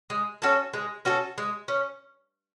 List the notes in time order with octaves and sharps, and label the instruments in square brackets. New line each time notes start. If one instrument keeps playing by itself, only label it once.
[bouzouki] G#3
C#4 F#4 A4
G#3
C#4 F#4 A4
G#3
C#4